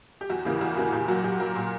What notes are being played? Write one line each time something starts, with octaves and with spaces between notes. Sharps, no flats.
G4
E2 F#4
C#3 E3 A#3 G4
E2 F#4
C#3 E3 A#3 F#4
A#2 G4
F#3 A#3 F#4
A#2 G4
F#3 A#3 A#4
A#2